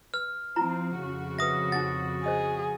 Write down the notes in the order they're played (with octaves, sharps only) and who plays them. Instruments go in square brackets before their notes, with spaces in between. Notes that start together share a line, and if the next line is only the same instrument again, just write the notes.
[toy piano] B4 E6 [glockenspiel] F6
[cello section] F3 C4 [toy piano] E4 F4 A#5
[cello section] F2 C#3 F#4
[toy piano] B4 E5 [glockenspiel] D#6 A#6
[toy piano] D#4 G#4 F#5 [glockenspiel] A6
[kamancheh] G#4 [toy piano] C5 D#5 D#6